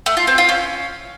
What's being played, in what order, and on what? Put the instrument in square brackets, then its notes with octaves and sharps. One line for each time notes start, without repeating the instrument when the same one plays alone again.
[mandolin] A3
F4
C4
F4
C#4